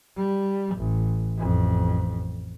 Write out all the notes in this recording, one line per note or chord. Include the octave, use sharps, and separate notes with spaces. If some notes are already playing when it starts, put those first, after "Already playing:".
G3
A1
A1 F2